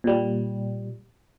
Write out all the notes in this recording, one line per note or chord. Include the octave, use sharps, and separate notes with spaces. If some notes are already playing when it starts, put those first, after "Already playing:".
A#2 G3